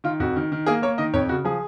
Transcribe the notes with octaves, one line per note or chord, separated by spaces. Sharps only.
D#3 F4
F2 F#4
D#3
D#3
A#3 G#4
A#3 C#5
D#3 D#5
F2 C#5
C#3 F#4
F3 G#4